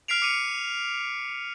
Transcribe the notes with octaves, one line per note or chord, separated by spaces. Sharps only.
F6 B6 C7 D7 F7
D6 C#7 D#7